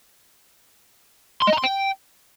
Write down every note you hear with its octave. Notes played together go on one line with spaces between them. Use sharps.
C6
D#5
A#5
C6
G5